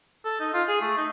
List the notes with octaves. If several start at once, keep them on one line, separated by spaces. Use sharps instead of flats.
A4
D#4
F4
G#4
A3
D#4